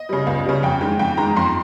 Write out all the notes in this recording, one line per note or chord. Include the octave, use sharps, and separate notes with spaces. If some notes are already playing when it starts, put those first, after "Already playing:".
Already playing: D#5
C#3 G3
C#2
C#3 G3
F2 G5
D#3 G#3
F2 G5
D#3 G#3 A#5
F2 C6